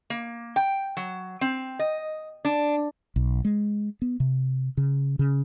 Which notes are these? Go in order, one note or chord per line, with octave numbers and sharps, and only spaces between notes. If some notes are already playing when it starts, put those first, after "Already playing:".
A#3
G5
F#3
C4
D#5
D4
B1
G#3
B3
C3
C#3
C#3